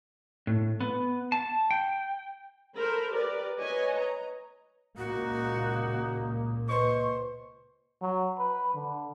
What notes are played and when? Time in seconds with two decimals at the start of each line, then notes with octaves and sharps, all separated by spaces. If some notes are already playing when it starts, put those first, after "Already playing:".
0.47 A2
0.81 B3
1.32 A5
1.71 G5
2.77 A4 A#4 C5 B5
3.15 G4 A#4 B4 D5
3.60 B4 C#5 D#5 G#5
3.98 A#5
4.97 C#2 A#2 A#3 D#4 F#4
6.69 A#2 B4 C5 D#5 C#6
8.02 F#3
8.39 B4
8.74 D3